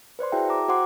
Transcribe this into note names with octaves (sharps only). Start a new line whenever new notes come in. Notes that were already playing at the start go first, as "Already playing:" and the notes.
B4 C5 D5 C6
E4 F#4 G#4 E5 G5 A5
G5 A#5 D6
F#4 C5 F#5 C6 D6